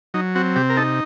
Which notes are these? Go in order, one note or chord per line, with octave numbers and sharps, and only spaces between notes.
F#3 D#4
C4 F#4
C3 G4
A#4
D#4 A4